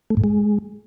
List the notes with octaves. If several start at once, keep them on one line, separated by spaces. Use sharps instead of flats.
A3
G#2
G#3